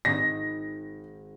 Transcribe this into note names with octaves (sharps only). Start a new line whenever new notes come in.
G#1 D#6 A#6